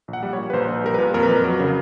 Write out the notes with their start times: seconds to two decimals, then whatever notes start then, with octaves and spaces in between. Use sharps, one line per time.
0.08 A#1
0.13 F#5
0.23 G3
0.33 C#5
0.38 A#2
0.50 B4
0.53 A#1 C5
0.68 A#1 B4
0.84 G3 A#4
0.94 B4
0.98 A#2
1.14 F2 A#4
1.23 B4
1.29 F2 A#4
1.44 F#3 A#4
1.60 C#3